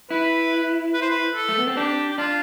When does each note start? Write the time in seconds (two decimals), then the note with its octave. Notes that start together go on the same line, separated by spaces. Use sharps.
0.10 E4 B4
0.93 B4
1.02 C5
1.10 B4
1.35 A4
1.49 A3
1.59 B3
1.68 C4
1.76 D4 G4
2.11 G4
2.18 D4 F4